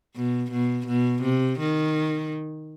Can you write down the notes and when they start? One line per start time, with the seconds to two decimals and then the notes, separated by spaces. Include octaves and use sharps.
0.15 B2
0.51 B2
0.87 B2
1.23 C3
1.59 D#3